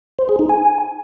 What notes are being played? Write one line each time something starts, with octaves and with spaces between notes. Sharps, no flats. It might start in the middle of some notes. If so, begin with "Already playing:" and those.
C5
G#4
D#4
G#5